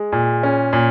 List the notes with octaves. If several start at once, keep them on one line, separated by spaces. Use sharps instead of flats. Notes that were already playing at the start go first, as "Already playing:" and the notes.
Already playing: G#3
A#2
C#4
A#2